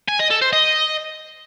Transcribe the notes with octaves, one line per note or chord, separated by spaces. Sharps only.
G#5
D#5
A4
C5
D#5